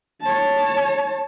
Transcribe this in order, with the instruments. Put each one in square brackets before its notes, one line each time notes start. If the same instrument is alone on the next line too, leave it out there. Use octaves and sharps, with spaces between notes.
[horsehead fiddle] C#5 A5